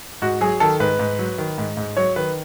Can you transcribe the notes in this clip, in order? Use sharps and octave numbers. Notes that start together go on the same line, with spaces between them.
G#2 F#4
F#3 G#4
D#3 A4
G#2 B4
G#2
F#3
D#3
G#2
G#2
F#3 C#5
D#3 B4